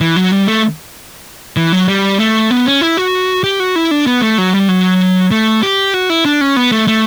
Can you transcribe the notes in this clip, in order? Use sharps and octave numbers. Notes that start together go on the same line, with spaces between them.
E3
F#3
G3
A3
E3
F#3
G3
A3
B3
C#4
E4
F#4
G4
F#4
E4
D4
B3
A3
F#3
G3
F#3
A3
G4
F#4
E4
D4
C#4
B3
A3
A3